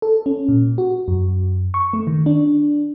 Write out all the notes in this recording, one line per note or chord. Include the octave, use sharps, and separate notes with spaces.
A4
C#4
A#2
F#4
F#2
C#6
A3
D#3
D4